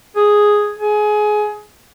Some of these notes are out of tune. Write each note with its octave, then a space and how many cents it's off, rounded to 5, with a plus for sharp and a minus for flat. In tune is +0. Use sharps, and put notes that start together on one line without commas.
G#4 +0
G#4 +20